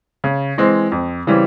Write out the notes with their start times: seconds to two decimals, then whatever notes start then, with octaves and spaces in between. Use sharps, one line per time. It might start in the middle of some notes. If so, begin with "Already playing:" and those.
0.24 C#3
0.58 E3 G#3 C4
0.92 F2
1.27 C#3 E3 G3 C4